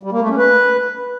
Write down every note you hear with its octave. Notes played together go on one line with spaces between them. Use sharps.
G3
A#3
A3
C#4
B4